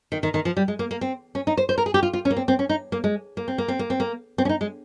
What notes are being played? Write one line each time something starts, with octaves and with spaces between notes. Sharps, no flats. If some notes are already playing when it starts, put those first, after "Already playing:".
D#3
D#3
D#3
F3
G3
G#3
A#3
A#3
C4
C#4
D#4
C5
C5
A#4
G#4
G4
F4
F4
C#4
A#3
C4
C4
C#4
D#4
A#3
G#3
A#3
C4
A#3
C4
A#3
C4
A#3
C4
C#4
D#4
G#3